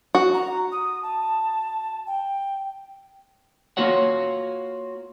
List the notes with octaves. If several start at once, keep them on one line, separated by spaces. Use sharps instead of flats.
F#4
A#5
D#6
A5
G5
A#3 F4 F#4 C#5 F#5